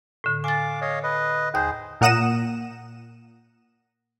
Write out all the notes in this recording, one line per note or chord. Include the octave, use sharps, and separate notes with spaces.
A2 D3
F5 G#5 D6 A6
C#5 D#5 F5
B4 D#5
D#2 G#4 C5 G6
A#2 A#4 F#5 D#6 A#6 E7